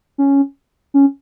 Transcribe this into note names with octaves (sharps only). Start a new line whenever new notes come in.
C#4
C#4